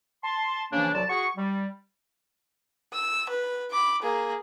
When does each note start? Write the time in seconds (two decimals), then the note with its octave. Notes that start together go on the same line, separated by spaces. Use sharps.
0.24 A5 C6
0.72 C#3 E3 F3 A#3 D4
0.94 C2 F#3 D5 A5
1.10 F#4 G#4 C#6
1.37 G3
2.93 E6
3.29 B4
3.71 B5 D6
4.02 A#3 G#4